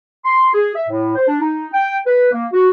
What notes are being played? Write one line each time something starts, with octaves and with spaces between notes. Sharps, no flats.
C6
G#4
E5
A2
C5
D4
D#4
G5
B4
A#3
F#4